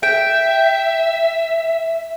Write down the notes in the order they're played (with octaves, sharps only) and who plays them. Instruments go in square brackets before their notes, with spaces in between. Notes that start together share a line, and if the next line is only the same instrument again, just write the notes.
[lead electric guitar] E5 [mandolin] G5